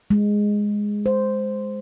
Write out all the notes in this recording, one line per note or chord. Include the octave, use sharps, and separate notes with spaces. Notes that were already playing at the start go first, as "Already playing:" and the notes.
G#3
C5